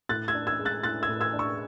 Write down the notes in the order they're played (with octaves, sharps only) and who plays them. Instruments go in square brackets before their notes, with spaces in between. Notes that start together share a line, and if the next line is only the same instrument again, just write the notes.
[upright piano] A2 F#6 A6
E6 G#6
D4
E6 G#6
G#3
F#6 A6
A2 F#6 A6
E6 G#6
A2
E6 G#6
D4
C#6 E6